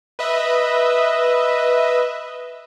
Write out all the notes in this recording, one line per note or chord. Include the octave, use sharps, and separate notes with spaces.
B4 D#5 E5